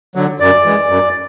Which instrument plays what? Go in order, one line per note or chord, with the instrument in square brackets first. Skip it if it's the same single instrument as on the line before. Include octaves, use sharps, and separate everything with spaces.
[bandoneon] D3 F#3
F#2 D5
E3 G#3
F#2